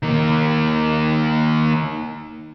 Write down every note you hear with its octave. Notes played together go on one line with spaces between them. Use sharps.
D#3 A#3